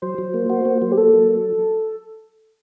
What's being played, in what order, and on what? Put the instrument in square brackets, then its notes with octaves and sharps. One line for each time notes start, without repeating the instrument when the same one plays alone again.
[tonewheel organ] F#3 [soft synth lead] C5
[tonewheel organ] F#3
A#3
F#4
A#3
F#3
[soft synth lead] G4
[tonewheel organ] A#3 [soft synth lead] A4
[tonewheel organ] F#3